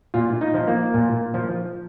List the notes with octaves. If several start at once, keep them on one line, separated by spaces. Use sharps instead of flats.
A#2 F4
D#4
F3
A#3
A#2
F3